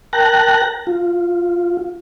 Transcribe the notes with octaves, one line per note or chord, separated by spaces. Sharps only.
A#4 G5 A5 F#6 A#6
F4